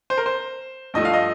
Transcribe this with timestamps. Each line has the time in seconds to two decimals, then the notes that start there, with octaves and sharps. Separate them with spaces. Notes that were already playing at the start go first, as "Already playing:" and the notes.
0.10 C5
0.18 A#4
0.26 C5
0.94 G2 F3 A3 D#5
1.05 F5
1.14 D#5